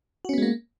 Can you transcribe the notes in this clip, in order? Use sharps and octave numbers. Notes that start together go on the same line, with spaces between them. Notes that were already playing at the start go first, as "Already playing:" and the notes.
G#3 A#3 B3 C#4 F#4